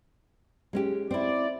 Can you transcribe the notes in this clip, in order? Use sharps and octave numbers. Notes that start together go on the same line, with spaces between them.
G#3 C#4 G4
C4 E4 D5